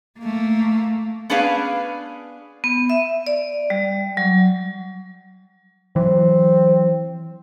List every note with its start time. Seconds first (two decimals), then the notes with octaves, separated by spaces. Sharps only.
0.20 A3 A#3
1.30 B3 C#4 D4 G#4 B4 F5
2.64 B3
2.90 E5
3.27 D5
3.70 G3
4.17 F#3
5.96 E3 F#3 C4